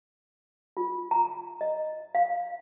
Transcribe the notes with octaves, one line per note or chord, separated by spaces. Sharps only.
F4
A#5
D#5
F5